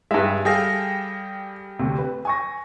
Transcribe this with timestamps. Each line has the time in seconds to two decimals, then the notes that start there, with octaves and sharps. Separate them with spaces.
0.11 G2 G#3 E5 A5
0.45 G3 G#4 A4 F5 G5 A#6
1.79 D2 C3
1.98 B4
2.25 G#5 C#6 A#6